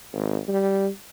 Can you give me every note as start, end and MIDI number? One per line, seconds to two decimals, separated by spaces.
0.13 0.39 32
0.48 0.88 55